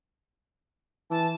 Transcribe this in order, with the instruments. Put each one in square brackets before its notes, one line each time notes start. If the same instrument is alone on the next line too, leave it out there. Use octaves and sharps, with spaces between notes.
[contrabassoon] E3 [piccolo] A5